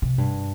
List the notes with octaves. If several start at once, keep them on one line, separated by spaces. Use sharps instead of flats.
C3
G2